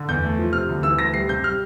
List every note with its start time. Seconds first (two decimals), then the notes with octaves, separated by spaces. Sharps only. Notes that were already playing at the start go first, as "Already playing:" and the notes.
Already playing: D3
0.09 E2 G6
0.23 A3
0.39 F3
0.53 C3 F6
0.69 D2
0.83 E3 E6
0.99 D2 A#6
1.14 G3 C7
1.28 C3 G6
1.44 G3 F6